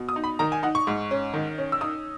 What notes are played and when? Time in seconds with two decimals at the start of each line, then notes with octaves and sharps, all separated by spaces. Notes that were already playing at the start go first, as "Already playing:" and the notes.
Already playing: B2
0.09 D#6
0.16 D#4
0.24 B5
0.39 D#3 A#5
0.52 G#5
0.63 D#4 F#5
0.75 C#6
0.87 G#2
1.11 C#4
1.33 D#3
1.58 C#4
1.72 E6
1.81 D#4 D#6